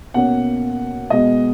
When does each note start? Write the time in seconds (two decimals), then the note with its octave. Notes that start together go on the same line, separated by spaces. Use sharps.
0.14 B2 A#3 C#4 F#5
1.10 B2 G#3 B3 D#5